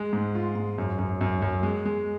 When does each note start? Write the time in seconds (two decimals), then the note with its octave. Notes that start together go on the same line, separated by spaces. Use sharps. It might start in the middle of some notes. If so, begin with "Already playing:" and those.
Already playing: G#3
0.13 G#2
0.35 F4
0.55 G#2
0.78 F#2
0.99 F#2
1.21 F#2
1.42 F#2
1.63 G#3
1.85 G#3